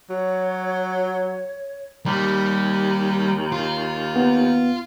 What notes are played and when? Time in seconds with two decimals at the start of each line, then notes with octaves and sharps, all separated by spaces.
0.10 F#3 C#5
2.06 D#2 G3
3.52 F4
4.16 B3